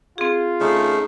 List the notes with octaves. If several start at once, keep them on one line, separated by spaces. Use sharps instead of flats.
C4 F4 G#4
C#3 A3 D#4